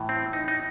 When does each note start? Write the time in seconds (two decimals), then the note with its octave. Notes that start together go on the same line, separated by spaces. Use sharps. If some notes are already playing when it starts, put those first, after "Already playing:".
Already playing: A2 E3
0.09 C4
0.33 D#4
0.48 D#4